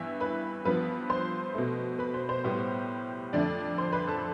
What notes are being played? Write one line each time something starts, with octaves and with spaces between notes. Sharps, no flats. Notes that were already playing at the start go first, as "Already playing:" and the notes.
Already playing: G2 E3 B3 E4 E5
B4 B5
G2 F3 B3 B4 B5
C5 C6
B2 A3
B4 B5
C5
C5
A2 G3 B3
F2 D3 A3 D4 D5
C5 C6
B4 B5
A4 A5